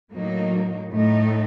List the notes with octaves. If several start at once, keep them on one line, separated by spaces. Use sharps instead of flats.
A2 F#3 A#3 D#4
A2 A3 D#4